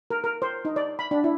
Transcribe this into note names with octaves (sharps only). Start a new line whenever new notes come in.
A#4
A#4
C5
D#4
D5
B5
D4
E4